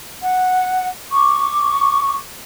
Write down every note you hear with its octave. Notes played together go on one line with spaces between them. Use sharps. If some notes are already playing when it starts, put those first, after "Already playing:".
F#5
C#6 D6